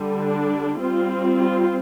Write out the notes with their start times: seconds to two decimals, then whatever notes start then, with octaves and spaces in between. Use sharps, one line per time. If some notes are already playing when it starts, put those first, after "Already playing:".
Already playing: D3 G3
0.21 D4
0.79 G3 C4 F4
1.38 F4